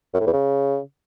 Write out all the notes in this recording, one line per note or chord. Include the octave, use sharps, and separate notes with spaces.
F#2
A2
E2
C#3